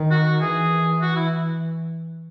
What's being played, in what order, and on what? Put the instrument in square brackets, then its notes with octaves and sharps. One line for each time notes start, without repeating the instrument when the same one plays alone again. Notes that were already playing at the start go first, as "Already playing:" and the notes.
Already playing: [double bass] D#3
[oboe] F#4
[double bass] E3 [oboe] G#4
[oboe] F#4
E4